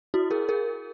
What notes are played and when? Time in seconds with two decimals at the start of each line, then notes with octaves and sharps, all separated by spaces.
0.14 E4 F#4
0.30 G#4 A#4
0.49 G#4 A#4